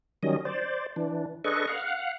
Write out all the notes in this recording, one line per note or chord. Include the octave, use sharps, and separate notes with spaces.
D#3 F#3 G3 C#4 D#5
C5 D5
E3 D4
D4 G#4 A4 B4 D#5 C#6
F5 F#5